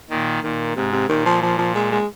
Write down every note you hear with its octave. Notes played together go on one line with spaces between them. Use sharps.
A#2 D#3
A#2 D#3
G#2 C3
C3
A#2 D#3
F3
F3
F3
G#3
G#3